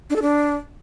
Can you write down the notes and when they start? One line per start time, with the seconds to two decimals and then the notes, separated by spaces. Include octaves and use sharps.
0.10 D4
0.16 A4
0.22 D4